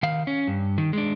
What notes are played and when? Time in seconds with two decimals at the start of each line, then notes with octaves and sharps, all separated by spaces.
0.03 D#3 F5
0.27 C#4
0.48 G2
0.78 D#3
0.93 G#3 D4